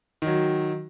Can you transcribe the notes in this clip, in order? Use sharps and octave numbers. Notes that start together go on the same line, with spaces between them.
D#3 F#3